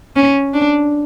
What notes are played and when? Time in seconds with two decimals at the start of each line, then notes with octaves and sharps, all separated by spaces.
0.16 C#4
0.54 D4